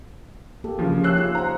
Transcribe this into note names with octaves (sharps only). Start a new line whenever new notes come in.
A#3 G4 A4
C#3 F3
E4 G4 C#5 E6 F#6 C7
D#4 F4 G#4
C5 F#5 A#5